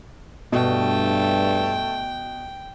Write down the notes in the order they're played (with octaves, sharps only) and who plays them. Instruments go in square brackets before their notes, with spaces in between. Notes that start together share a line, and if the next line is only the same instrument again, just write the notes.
[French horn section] G2 [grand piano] B2 [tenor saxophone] A3 [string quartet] G5